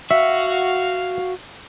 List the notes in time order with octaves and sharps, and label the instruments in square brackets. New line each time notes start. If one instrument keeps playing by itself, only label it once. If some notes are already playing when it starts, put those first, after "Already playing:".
[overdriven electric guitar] F#4 [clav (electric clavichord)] E5 [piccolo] F5